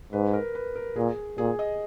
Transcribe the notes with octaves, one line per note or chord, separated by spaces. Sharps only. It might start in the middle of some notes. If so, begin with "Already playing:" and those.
G#2 B4
A#4
B4
A#4
A#2 G#4
A#2 G#4
D#5